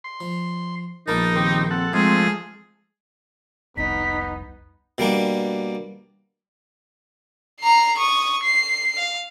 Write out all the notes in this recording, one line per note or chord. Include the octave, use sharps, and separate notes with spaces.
C6
F3
A#1 A#3 B3 D#4 A#4 A5
D#3 C4 G4
C4 A4 F#5
G#2 F3 G#3 A3 C4 G#4
F1 C2 B3 D#4 B6
B2 G3 A#3 D4
A#5 C7
C#6 D#6
C7
F5